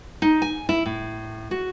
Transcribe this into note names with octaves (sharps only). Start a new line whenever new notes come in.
D#4
G#5
E4
A2
F#4